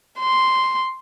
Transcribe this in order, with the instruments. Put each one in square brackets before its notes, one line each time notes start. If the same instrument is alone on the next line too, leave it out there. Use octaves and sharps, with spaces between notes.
[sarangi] C6